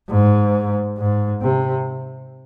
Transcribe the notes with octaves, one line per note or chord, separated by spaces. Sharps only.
G#2
G#2
C3